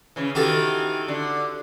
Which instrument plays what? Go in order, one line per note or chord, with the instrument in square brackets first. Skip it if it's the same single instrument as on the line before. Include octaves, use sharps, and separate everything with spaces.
[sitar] C#3 E3
[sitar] D#3 E3 [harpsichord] F#4 G4 A4
[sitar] D3